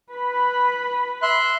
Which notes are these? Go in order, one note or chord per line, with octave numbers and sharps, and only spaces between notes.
B4 B5
E5 C6 F#6